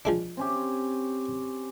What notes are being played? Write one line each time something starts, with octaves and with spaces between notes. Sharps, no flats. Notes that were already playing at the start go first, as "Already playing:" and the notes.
F3 G#3 D4
C4 C#4 G4